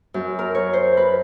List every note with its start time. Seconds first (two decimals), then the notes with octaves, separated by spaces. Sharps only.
0.14 F#2
0.39 A#4
0.55 C#5
0.73 C5
0.97 B4